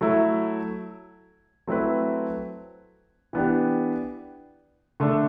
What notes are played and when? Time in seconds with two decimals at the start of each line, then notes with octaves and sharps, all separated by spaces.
0.01 F#3 A3 E4
1.67 F#3 A3 C4 E4 B4
3.33 E3 B3 D4 G4
5.00 D3 A3 D4 A4